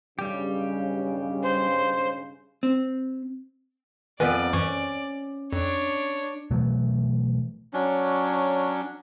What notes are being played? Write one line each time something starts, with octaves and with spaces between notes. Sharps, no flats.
B1 G2 C#3 G3 G4
C5
C4
F2 D#3 B3 B4 D5 G#5
F#2 E3 C#4 C#6
F2 D4 C#5
B2 E3 F#3 A3
F#3 C#4 D4